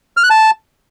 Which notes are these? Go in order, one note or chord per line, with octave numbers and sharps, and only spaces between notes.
F6
F#6
A5